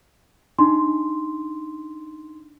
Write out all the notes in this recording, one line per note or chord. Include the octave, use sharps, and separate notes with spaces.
D4 D#4 C6